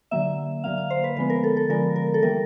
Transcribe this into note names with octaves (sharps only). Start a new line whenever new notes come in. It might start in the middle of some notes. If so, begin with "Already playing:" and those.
D3 F#3 A#3 E5
D3 F#3 A#3 F5
F5
C5
B4
D3 F3 G#3 B3 B4
A#4
A4
A4
D3 F3 G#3 B3 A#4
A#4
A4
E3 G3 A#3 A#4